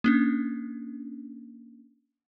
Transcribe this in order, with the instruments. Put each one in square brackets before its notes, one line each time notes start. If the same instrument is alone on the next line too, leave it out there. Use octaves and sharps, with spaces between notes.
[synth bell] A#3 C#4 D4